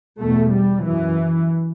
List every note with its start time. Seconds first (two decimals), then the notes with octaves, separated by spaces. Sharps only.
0.20 E2 B2 A3
0.52 G3
0.84 F#2 E3